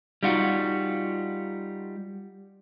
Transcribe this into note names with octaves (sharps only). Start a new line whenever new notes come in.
G3 D#4 F4 F#4